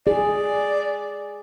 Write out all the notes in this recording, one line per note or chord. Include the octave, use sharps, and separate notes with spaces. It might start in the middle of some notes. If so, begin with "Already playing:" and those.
G#4 D5